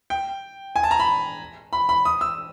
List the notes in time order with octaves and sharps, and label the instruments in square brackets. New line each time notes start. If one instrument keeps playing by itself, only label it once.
[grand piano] G5
G#5
A5
A#5
B5
B5
B5
D#6
E6